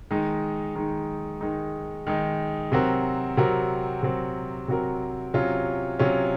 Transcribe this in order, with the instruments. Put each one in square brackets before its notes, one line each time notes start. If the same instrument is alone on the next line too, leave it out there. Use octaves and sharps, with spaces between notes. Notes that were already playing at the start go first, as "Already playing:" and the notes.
[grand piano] D#3 G#3 D#4
D#3 G#3 D#4
D#3 G#3 D#4
D#3 G#3 D#4
C3 F#3 C4 F#4 A#4
C3 F#3 C4 F#4 A#4
C3 F#3 C4 F#4 A#4
C3 F#3 C4 F#4 A#4
C3 F#3 C#4 F4
C3 F#3 C#4 F4